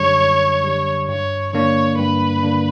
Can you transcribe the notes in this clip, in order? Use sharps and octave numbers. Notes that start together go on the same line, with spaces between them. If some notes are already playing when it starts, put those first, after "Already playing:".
Already playing: F#2 D3 G3 C#5
F#2
D3 G3
G2 C#5
D3 A#3 D4 C#5
G2 B4
D3 A#3 D4